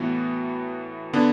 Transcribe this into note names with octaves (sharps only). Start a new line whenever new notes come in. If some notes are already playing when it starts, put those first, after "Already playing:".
Already playing: A2 E3 B3 F#4
D3 B3 D4